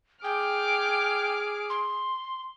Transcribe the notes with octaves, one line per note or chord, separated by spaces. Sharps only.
G#4 G5 D6 F6
C6